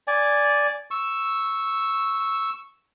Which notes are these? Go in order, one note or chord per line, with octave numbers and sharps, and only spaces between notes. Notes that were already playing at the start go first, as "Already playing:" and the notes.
D5 G#5
C#6 E6